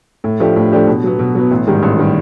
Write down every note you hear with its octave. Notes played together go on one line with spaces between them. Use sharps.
A2
F3 A3 D4 G4
A2
F3 A3 D4 G4
B2
F#3 B3
B2
F#3 B3
A1
G#2 D#3 G3
A1
D#3 G3